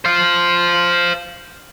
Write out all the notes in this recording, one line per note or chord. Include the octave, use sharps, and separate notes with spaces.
C5 F5